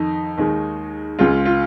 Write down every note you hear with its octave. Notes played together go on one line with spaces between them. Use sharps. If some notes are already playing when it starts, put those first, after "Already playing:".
Already playing: F2 D#3 D#4
D#2 D#3 G#3
C#2 C#3 G#3 F4
F4